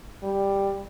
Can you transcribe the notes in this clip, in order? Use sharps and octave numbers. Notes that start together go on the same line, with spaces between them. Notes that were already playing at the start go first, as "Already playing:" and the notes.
G3